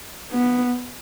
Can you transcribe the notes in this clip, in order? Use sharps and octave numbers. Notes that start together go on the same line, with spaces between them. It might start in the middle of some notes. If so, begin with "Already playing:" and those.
B3